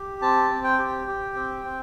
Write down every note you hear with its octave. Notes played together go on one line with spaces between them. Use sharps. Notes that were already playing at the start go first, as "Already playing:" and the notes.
Already playing: G4
C4 A5
C4
G5
G4
G4
C4
C4